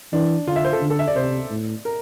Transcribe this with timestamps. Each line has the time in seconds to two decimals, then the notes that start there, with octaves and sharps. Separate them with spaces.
0.13 E3 D4
0.47 D3 F4
0.56 E5
0.65 C5
0.73 A4
0.82 D3
0.90 A4
0.99 E5
1.08 D5
1.16 C3 C5
1.50 A2
1.85 A#4